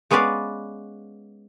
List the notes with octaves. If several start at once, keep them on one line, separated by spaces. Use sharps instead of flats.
G#3 B3 C#4 B4 D5 F5